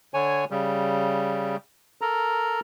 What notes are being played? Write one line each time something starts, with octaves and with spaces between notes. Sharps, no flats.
D3 C#5 G#5
C#3 G3
A4 A#4 A#5